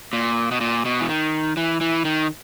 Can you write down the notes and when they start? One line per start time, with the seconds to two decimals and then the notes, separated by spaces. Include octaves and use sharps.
0.13 A#2
0.51 B2
0.61 A#2
0.85 B2
1.01 E3
1.09 D#3
1.57 E3
1.81 E3
2.05 D#3